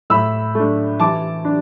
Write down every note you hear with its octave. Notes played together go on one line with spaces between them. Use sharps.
A2 B5 E6
A3 D4
E3 A5 D6
D4